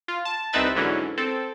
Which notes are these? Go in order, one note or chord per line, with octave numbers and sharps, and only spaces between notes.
F4
A5
C2 C4 D#4 B4 E5 A6
G#2 D3 E3 F#3 C#4
C4 A4